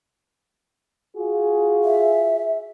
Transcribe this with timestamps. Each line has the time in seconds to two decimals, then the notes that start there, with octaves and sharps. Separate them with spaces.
1.17 F4 F#4 G#4
1.84 E5